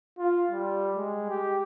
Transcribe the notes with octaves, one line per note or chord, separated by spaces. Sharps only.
F4
G3
G#3
G4